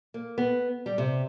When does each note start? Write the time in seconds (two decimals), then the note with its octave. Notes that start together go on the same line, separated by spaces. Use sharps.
0.14 A#3
0.38 B3
0.86 G3
0.98 C3